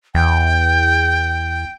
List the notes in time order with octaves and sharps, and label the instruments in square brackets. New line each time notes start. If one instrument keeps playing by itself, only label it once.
[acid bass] E2 [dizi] G5